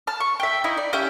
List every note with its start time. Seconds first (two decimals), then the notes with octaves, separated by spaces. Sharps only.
0.07 A5 F6
0.20 C#6
0.40 E5 G5
0.64 D#4 E4
0.77 D5
0.93 C#4 G4 E5 G5